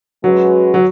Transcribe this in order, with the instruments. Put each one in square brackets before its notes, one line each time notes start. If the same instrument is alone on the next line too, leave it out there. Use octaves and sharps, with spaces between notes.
[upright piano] F#3 [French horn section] G#3 C#4 F#4 B4
[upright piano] F#3